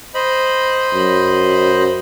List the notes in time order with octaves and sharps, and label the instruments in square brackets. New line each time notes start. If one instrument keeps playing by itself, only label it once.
[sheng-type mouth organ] C5 D#5 B5
[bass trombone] F#2